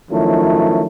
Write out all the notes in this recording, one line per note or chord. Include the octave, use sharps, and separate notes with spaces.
D#3 F3 F#3 A3 C#4 E4